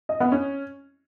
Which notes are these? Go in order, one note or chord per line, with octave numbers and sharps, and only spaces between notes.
D#5
B3
C#4